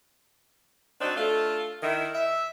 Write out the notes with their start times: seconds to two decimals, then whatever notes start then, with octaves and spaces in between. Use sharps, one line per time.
1.00 C4 D4 D#4 F#4 D5
1.17 A3 D4 F4 A4
1.82 D#3 E4
2.13 E5